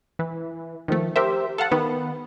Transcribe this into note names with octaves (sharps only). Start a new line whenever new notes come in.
E3
D#3 F3 A3
G4 A#4 C5 E5
A4 F5 F#5 A5
D#3 B3